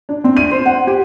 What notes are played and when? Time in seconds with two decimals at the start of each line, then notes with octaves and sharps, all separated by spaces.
0.09 D4
0.24 C4
0.37 D#7
0.51 C5
0.66 F#5
0.87 G4